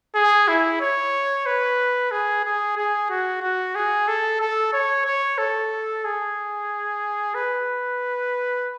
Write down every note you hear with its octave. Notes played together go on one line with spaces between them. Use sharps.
G#4
E4
C#5
B4
G#4
G#4
G#4
F#4
F#4
G#4
A4
A4
C#5
C#5
A4
G#4
B4